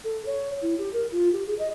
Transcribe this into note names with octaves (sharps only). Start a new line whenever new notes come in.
A4
C#5
E4
G4
A#4
F4
G4
G#4
D#5